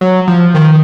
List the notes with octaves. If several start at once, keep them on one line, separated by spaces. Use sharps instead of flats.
F#3
F3
D#3